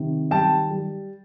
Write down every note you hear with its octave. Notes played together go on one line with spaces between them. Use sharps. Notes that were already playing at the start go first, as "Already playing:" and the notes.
Already playing: C3 D#3
G3 G5 A5
G3